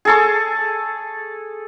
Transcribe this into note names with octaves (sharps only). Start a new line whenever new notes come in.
G#4 A4 C#6